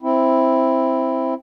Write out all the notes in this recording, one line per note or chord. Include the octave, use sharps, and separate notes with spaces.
C4 E4